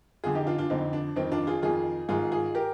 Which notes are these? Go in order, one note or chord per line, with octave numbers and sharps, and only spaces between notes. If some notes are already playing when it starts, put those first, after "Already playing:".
F2 D3 F4 G#4
D#4 G4
D4 F4
D4 F4
F2 D3 C4 D#4
D4
F2 D#3 C4 D#4
D4 F4
F4 G#4
F2 D#3 F4 G#4
G#2 D#3 F4 G#4
F4 G#4
G4 A#4